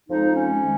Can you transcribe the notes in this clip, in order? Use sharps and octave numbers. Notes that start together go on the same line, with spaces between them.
F2 F3 G#3 D#4
C#4
D#3 G#3